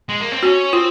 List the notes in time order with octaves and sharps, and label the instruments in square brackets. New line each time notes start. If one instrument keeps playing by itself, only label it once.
[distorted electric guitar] G#3
A#3
C4
[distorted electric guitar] C#4 [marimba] F#4
[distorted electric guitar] C4 [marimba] F4